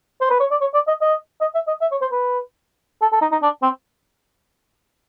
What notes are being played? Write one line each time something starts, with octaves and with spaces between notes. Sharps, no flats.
C5
B4
C#5
D5
C#5
D5
D#5
D#5
D#5
E5
D#5
E5
C#5
C5
B4
A4
A4
D#4
D#4
D4
C4